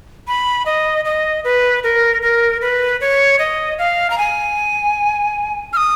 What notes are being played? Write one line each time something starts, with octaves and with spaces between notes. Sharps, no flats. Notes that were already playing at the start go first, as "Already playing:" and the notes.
B5
D#5
D#5
B4
A#4
A#4
B4
C#5
D#5
F5
A#5
G#5
F6
D#6